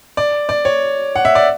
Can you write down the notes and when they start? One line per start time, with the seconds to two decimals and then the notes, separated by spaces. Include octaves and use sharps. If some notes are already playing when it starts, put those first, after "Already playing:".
0.17 D5
0.49 D5
0.65 C#5
1.16 F#5
1.25 E5
1.35 D5